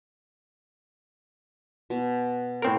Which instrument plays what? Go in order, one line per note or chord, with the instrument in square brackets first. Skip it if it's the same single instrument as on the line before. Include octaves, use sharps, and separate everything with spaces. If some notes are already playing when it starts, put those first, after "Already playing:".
[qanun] B2
[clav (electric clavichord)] A2 C4 A#4